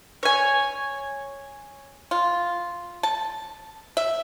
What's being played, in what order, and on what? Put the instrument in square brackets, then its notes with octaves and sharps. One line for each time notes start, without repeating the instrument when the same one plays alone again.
[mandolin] C#5 G#5
[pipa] F4
A5
E5